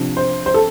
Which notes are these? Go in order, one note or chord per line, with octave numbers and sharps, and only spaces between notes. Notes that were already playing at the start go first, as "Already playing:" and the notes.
Already playing: C3 F3 D4
C5
C5
A4